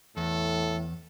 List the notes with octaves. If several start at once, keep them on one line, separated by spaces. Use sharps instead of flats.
E2 A2 A4